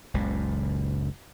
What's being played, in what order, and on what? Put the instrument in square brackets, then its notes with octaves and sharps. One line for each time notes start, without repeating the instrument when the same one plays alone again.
[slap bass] F#1 C#2 A#2